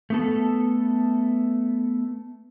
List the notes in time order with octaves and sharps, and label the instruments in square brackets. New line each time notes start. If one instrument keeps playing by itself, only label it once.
[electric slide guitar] A3 B3 A4